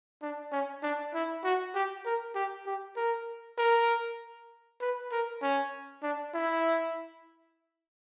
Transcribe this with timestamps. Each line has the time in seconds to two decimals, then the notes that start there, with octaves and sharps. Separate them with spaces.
0.22 D4
0.52 C#4
0.83 D4
1.14 E4
1.44 F#4
1.75 G4
2.06 A#4
2.35 G4
2.66 G4
2.97 A#4
3.58 A#4
4.81 B4
5.12 A#4
5.42 C#4
6.03 D4
6.34 E4